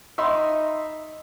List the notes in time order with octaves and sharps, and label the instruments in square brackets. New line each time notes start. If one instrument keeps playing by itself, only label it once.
[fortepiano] D#4 E5 B5 C6